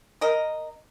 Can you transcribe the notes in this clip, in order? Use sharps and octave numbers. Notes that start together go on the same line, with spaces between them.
A#4 D#5